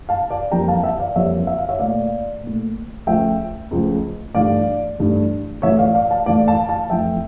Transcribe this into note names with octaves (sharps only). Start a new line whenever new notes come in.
F5 A5
D5 F5
F2 E3 G3 A#3 G5 A#5
F5 A5
E5 G5
D5 F5
F2 E3 G3 A#3 C#5 E5
E5
F5
C#5 E5
A#2 A3 D5 F5
A#2 A3
C#2 C#3 F3 A3 E5 G5
C#2 C#3 F3 A3
G2 E3 A3 D5 F5
G2 E3 A3
A2 E3 A3 C#5 E5
D5 F5
D5 F5
F5 A5
A2 E3 A3 D5 F5
F5 A5
F5 A5
F2 E3 A3 E5 G5